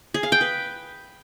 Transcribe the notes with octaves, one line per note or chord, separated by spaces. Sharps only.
G#4
F5
G5
B4